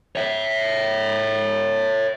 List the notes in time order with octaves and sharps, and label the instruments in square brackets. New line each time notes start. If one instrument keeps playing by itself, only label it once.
[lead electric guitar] C#5 E5